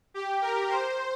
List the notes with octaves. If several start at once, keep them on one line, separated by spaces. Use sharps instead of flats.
G4
A#4
C5